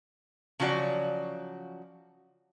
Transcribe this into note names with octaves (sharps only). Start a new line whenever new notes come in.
C#3 F3 F#3 F#4 D5